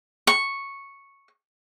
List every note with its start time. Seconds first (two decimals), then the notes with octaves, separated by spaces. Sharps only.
0.27 C#6